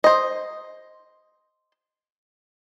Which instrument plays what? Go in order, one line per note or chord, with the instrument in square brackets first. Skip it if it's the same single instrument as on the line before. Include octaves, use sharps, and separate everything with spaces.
[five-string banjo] C5 D#5